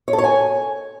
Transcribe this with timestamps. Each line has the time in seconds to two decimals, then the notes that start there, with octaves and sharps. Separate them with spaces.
0.08 C#5
0.13 A4
0.18 C#5
0.24 G#5